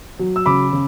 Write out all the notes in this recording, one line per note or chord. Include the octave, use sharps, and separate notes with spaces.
F#3
E6
C#3 B5 D6
C#3